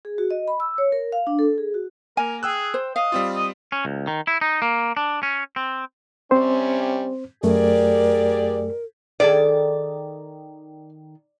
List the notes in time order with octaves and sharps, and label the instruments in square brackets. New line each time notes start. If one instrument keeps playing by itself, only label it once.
[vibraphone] G#4
F#4
D#5
B5
E6
C#5
A#4
F5
D4
A4
G#4
F#4
[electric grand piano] A#3 [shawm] A#4 [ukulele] G#5
[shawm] G#4 [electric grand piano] G5 E6 F#6
[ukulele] C5
[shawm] D#5 [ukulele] F5
[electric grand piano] G3 C4 F4
[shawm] D#5
[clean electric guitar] C#4
C#2
D#3
E4
D#4
A#3
D4
C#4
C4
[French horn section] C3 G3 C#4 [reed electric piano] C4 C5
[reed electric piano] F#2 A3 [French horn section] G4 G#4 D5 [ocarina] A#4
[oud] D#3 G#4 A4 [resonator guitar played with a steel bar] D5